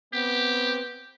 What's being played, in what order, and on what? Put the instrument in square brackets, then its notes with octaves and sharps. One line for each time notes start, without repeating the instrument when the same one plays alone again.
[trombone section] B3 C4 [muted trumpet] G4